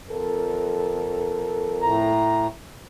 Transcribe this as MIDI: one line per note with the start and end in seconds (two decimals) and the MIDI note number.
0.11 2.23 41
0.11 2.23 69
0.11 2.23 70
1.82 2.47 45
1.82 2.47 82